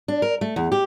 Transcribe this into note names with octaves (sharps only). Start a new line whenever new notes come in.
D4
A#4
A3
E2
G4